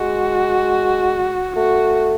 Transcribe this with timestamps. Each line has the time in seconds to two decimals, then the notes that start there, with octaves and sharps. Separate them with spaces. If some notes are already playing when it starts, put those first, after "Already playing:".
Already playing: G#3 F#4
1.56 A3 F#4